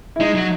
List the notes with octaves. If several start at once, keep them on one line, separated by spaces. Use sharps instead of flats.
E4
G#3 D#4
F#3